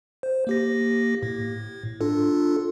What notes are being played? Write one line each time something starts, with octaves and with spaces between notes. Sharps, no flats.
C5
A#3 G4 A#6
A2
D4 F4 A4